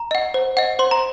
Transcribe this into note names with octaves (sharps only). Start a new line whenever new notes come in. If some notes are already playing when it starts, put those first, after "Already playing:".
Already playing: A#5
D#5 F#5
C5
D#5 F#5
C5 C6
A#5